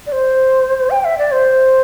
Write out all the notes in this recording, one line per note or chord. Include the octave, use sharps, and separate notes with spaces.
D5
C5
G5
E5
D5
C5